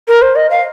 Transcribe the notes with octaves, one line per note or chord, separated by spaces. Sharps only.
A#4
C5
D#5
F5